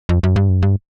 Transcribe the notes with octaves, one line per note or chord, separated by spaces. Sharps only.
F2
F#2
G2
F#2
G2